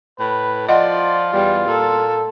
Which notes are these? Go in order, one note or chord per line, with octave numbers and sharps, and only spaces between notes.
A2 B4
F3 F4 D5 D#5 F#5
E2 G3
A#2 A4